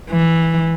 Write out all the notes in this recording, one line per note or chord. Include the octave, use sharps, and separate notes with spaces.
E3